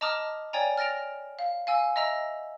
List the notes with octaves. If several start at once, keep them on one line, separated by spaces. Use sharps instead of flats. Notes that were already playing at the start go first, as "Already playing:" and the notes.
D#5 A5 A#5 D6 D#6 F6
C#5 D5 G5 G#5 A#5
F6 A6 A#6 D7 F7
F5
F5 G#5 E6
D#5 E5 A#5 E6